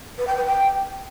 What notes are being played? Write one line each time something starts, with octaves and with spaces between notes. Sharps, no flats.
B4
G5
B4
G5